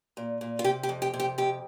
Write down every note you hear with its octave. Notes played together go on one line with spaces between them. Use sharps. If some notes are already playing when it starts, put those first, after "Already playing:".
A#2
A#2
F4
C3 G4
G4
F2
G4
C3
G4
F2 G4